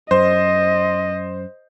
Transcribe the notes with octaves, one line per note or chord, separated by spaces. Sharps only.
F#2 C5 D#5